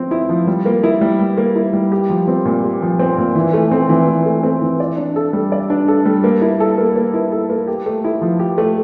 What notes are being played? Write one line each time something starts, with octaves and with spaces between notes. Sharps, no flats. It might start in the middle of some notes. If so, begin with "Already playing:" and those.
Already playing: F3 C4
E4
F3
G3
A#3
E4
G3
G3
A#3
E4
G3
G4
F3
C4
A#2
G4
F3
C4
A#2
E3
A3
C4
E3
E3
A3
C4
E3
D5
D4
A4
G3
D5
D4
A4
G3
A#3
E4
A4
A#3
A#3
E4
A4
A#3
G4
A3
E4
F3
G4
A3